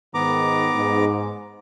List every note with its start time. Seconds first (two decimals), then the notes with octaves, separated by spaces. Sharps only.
0.14 G#2 D#3 B3 A#5 D6
0.74 G#2